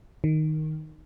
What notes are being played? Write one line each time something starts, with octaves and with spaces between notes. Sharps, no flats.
D#3